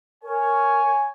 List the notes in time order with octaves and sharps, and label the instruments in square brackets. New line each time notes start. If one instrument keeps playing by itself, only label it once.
[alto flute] A#4 [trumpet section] C#5 G#5